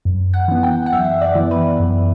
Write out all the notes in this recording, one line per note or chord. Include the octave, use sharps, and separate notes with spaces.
F#2
F#5
E3 B3
G5
F#5
F#2 E5
D5
E3 B3
B4
F#2